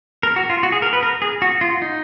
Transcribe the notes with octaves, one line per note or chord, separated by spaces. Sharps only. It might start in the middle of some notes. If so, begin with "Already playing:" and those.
A#4
F#4
F4
F#4
G#4
A#4
B4
A#4
G#4
F#4
F4
D#4